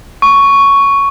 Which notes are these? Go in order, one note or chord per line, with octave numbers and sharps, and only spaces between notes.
C#6